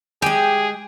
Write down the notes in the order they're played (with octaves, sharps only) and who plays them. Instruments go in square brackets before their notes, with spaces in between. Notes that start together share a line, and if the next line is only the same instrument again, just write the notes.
[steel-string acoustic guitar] G#3 G#5 [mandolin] G4 [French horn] G#4